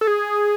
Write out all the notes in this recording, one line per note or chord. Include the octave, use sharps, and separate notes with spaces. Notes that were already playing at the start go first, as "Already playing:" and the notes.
A4
G#4